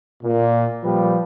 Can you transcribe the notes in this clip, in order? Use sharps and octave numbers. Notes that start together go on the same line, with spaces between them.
A#2
A#2 F3 G3 B4 G5